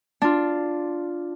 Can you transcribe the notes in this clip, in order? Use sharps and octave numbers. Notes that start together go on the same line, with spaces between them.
D4 F4